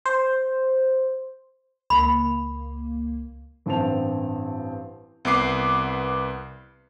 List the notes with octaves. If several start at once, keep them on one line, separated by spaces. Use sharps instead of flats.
C5
C#2 A#3 B5
A1 G2 C4 A5 F7
C2 B3 B4 D6 C7